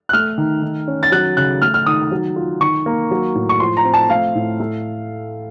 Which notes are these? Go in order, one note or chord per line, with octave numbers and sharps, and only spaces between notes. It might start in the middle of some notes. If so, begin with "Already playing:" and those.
F#6
A3 F6
D#3
D#3
C#4
A6
F#3 F#6
C#3 F#6
A3 F6
F6
D#3 D#6
F#3
F4
D#3 C#6
A#3
F#3
A2
C#6
F3 C6
A#5
C4
A5
A3 F5
A2
A3